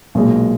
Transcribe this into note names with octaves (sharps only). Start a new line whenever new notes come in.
B1 A#2 G#3